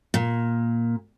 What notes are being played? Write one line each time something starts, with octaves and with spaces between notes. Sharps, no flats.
A#2